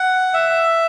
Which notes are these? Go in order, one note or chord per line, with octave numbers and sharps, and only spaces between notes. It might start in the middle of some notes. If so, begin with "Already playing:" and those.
Already playing: F#5
E5